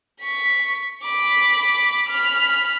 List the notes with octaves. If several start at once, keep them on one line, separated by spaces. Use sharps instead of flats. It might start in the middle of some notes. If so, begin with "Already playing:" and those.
C#6 B6
B5 D6
B5 F6